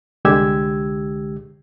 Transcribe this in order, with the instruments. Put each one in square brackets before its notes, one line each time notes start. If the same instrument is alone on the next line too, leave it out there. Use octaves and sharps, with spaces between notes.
[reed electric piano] C2 D3 G#3 G4 E6 G#6